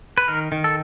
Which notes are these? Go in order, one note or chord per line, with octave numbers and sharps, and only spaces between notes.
B4
D#3 A#4
D#3
A4